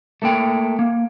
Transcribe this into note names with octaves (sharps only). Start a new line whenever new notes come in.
A3 A#3 G5
A#3